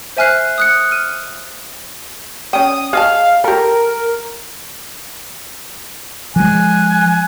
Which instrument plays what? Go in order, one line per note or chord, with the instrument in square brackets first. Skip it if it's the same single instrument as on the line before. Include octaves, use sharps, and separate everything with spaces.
[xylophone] C5 E5 G#5 F6 F#6 C7
D#6 F#6 C#7
F6 D#7
[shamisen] C#4 G5 [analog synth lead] D#6
[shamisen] G#4 D#5 A5 [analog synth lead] F5
[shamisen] G4 A4 [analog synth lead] A#4
[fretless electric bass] F3 G#3 [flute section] G#5 F#6